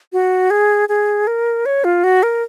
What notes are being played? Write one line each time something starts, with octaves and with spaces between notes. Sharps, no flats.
F#4
G#4
G#4
A#4
C#5
F4
F#4
A#4